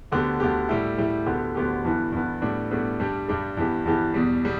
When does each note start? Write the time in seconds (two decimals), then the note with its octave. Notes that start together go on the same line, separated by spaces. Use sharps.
0.12 D2 D3 B3 G4
0.40 D2 D3 B3 G4
0.69 A2 G3 E4 G4
0.98 A2 G3 E4 G4
1.26 D2 D3 B3 G4
1.55 D2 D3 B3 G4
1.84 G2 E3 B3
2.12 G2 E3 B3
2.41 A2 G3 B3 D4
2.71 A2 G3 B3 D4
2.99 G2 G3 D4 G4
3.28 G2 G3 D4 G4
3.57 G2 E3 B3 G4
3.85 G2 E3 B3 G4
4.14 E2 B2 G3
4.45 B2 G3